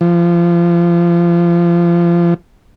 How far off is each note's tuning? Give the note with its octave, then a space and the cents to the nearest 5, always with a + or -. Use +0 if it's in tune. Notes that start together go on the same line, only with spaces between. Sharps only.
F3 -25